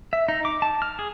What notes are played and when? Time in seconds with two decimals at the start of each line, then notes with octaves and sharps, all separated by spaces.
0.13 E5
0.28 D#4
0.45 D6
0.62 A5
0.82 F6
0.99 G#4